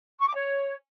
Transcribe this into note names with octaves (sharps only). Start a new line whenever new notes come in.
C#6
D6
C#5